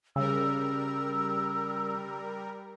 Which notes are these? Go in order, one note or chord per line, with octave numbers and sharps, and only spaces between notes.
C#3 G3 A#4 E6